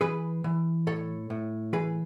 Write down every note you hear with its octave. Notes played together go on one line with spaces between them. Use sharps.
E3 G#4 B4
E3
A2 A4 C#5
A2
E3 G#4 B4